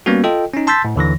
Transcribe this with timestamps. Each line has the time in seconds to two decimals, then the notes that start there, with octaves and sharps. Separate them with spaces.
0.06 G3 A#3 B3 C#4 F#4
0.24 F4 A4 D#5 G5
0.53 C#4 D#4
0.67 A5 C6 E6 G6 A6 B6
0.85 A2
0.96 D#2 D3 E3 A#6